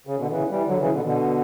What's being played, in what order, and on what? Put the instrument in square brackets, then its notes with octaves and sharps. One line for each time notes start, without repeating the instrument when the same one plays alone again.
[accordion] C#3
B2 D3
C#3 E3
E3 G3
D3 F#3
C#3 E3
B2 D3
B2 D3